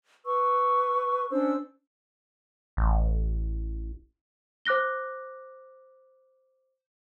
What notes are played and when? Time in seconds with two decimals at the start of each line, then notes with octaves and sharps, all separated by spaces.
0.25 B4 C#6 E6
1.31 C#4 D4 C5 E6
2.77 A1
4.65 C5 D6 F#6 A#6 G7